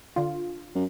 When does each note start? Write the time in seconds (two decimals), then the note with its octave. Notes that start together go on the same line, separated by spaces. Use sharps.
0.16 D3 F4
0.75 F#2